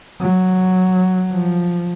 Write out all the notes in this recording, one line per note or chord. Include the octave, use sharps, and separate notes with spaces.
F#3
F3